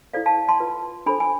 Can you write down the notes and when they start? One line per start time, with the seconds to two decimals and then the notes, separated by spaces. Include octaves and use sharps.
0.14 E4 A4 C5 D5 F5
0.26 F5 A5
0.49 A5 C6
0.60 F4 B4
1.06 D4 A4 C5 G#5 B5
1.20 G#5